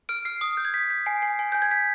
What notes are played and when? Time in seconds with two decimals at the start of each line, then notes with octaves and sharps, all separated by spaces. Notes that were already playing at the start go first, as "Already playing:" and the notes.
0.09 F6 D7
0.25 F6 C7
0.41 D#6
0.57 G6
0.65 G#6
0.74 G6 B6
0.90 G6
1.06 G#5 C7
1.22 G#5 C7
1.39 G#5
1.52 G#5 G6
1.62 G#6
1.71 G6 B6